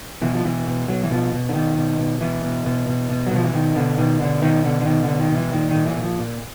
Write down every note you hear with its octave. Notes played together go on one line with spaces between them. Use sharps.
B2 E3
F3
B2 E3
B2
B2 F#3
E3
B2 F3
B2
D3
B2 D#3
B2
B2
B2 E3
B2
B2
B2
B2
F#3
B2 F3
E3
B2 D#3
B2 D3
B2 D#3
B2 D3
B2 D#3
B2 D3
D3
B2 D#3
D3
B2
D#3
B2
E3
A#2 D#3
D#3
A#2
E3
A#2
F3
A#2